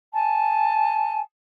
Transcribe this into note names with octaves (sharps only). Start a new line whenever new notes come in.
G#5 A5